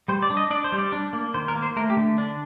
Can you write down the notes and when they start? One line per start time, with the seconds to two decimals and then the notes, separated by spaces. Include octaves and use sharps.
0.08 G3 C5
0.22 D5
0.30 D4
0.37 D#5
0.50 D4 D5
0.64 C5
0.72 G3
0.78 D5
0.92 D4
1.13 A#3
1.34 D#3 C5
1.48 A#4
1.55 A#3
1.62 C5
1.76 A3 A#4
1.90 G4
1.97 D3
2.18 D4